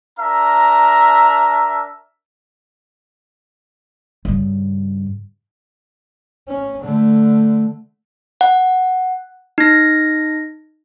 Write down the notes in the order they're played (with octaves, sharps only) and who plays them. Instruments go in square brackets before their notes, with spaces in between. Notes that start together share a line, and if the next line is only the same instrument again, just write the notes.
[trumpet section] D4 A#4 E5 A#5
[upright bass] G2 C#3
[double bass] C#4
D3 A3
[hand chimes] F#5
D#4 A#6